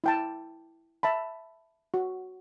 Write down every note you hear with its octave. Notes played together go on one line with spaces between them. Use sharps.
E4 G5 A5
E5 A5 B5
F#4